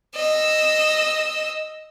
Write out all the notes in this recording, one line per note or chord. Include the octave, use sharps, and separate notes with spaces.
D#5 E6